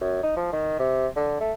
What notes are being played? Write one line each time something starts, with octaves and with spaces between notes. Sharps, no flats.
F#2
D#4
F3
D#3
C3
D3
A3